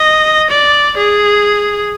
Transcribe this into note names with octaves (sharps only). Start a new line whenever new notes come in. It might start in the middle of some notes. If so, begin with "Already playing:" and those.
Already playing: D#5
D5
G#4